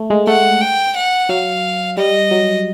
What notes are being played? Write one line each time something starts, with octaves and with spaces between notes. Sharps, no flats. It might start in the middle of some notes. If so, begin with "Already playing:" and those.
Already playing: A3
G#3
A3 F#5
G5
F#5
F#3 F5
G3 D#5
F#3